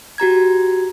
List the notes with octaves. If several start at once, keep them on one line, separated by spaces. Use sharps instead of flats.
F#4 G4 A#5 G#6